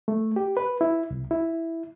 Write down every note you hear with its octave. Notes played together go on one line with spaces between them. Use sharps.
A3
G4
B4
E4
C2
E4